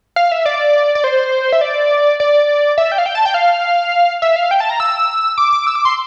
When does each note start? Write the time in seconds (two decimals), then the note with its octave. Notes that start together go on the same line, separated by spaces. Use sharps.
0.16 F5
0.32 E5
0.46 D5
0.95 D5
1.04 C5
1.52 E5
1.61 D5
2.20 D5
2.78 E5
2.92 G5
2.98 F5
3.06 G5
3.15 A5
3.25 G5
3.34 F5
4.22 E5
4.36 F5
4.51 G5
4.60 A5
4.70 A#5
4.80 E6
5.38 D6
5.52 D6
5.67 E6
5.75 D6
5.85 C6